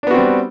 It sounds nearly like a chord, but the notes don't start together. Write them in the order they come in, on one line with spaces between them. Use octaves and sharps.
D4 B3 F#4 C4 G3